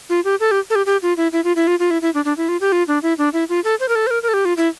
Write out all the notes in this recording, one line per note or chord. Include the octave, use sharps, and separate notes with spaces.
F4
G4
A4
G4
A4
G4
G4
F4
E4
E4
F4
E4
F4
F4
E4
E4
D4
D4
E4
F4
G4
F4
D4
E4
D4
E4
F4
A4
C5
A#4
A4
C5
A#4
A#4
A4
G4
F4
E4